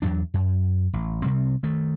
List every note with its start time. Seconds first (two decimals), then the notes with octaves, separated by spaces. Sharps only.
0.02 E2 G2 F#3 D4
0.34 F#2
0.93 A1
1.22 C3 G3 C4
1.63 D#3 A3